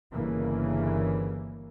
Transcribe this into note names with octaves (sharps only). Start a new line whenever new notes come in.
G1 C#3 E3 A#3